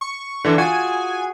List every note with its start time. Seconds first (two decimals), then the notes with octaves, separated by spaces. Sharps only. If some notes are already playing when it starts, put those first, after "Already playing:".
0.01 C#6
0.44 D3 E3 D4
0.58 F4 F#4 G#4 G#5